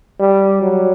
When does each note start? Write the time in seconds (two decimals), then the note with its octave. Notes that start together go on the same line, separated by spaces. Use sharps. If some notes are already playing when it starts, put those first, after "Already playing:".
0.20 G3
0.62 F#3